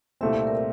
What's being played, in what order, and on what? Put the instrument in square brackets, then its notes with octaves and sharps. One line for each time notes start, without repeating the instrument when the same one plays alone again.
[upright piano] C2 A#2 A3 C4 [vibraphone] E5
[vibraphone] D5
A#4